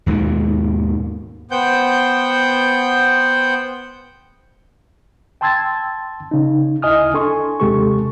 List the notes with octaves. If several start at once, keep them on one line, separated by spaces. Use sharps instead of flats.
D#2 G#2 B2 D#3
B3 C5 F#5 G5 G6
G5 A5 C6 E6 G#6 A6
C#3 D#4
D2 E4 D#5 G#5 D#6 F6
D4 A4 G#5 C6 C#6
D#2 C3 G#3 G4 A4 C#6